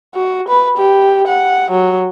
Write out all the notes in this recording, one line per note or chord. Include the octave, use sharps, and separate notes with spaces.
F#4
B4
G4
F#5
F#3